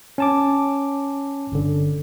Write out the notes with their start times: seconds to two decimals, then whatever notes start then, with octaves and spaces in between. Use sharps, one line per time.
0.18 C#4 A5 D6
1.52 G1 D3